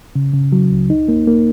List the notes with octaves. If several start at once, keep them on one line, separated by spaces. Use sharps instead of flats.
C#3
C#3
F#3
C#2
D#4
A#3
A#3